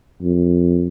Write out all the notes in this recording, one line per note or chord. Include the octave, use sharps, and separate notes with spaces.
F2